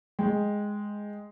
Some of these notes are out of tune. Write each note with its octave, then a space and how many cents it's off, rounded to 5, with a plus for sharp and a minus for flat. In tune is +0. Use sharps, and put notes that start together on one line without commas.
G#3 +0 G5 +0